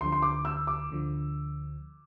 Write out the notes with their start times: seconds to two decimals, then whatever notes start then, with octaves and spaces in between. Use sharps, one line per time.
0.01 D2 D3 F3 C6
0.12 C6
0.22 D6
0.45 E6
0.67 D6
0.91 D2 D3 F3